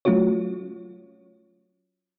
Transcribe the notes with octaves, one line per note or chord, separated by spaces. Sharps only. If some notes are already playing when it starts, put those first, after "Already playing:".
F#3 A3 C#4 F4 F#4 C#5